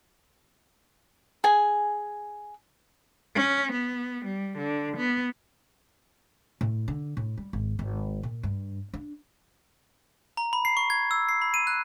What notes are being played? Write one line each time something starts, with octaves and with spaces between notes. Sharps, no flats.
G#4 G#5
C#4
B3
G3
D3
B3
A2
D3
A2
G3
G#1
G#1
A#2
G2
D4
A#5
B5
C7
C#6
G#6
E6
C7
B5
D#7
F#6